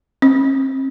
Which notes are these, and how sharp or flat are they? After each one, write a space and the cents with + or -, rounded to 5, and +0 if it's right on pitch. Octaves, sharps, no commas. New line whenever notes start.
C4 +45